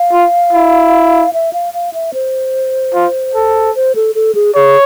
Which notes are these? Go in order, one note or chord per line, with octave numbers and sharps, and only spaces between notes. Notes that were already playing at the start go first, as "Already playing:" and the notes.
Already playing: F5
F4
E4
E5
F5
F5
E5
C5
F4
A4
C5
A4
A4
G#4
G#4 C#5